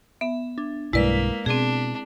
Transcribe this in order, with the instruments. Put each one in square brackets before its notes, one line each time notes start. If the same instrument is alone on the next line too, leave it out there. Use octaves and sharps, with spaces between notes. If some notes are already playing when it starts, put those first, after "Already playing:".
[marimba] B3 [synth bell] E5
[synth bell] D4
[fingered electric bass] B1 G2 [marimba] G#3 B4 [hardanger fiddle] A#3 [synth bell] E4 D5 B6
[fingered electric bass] B2 [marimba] C4 G#4 [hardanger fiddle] D4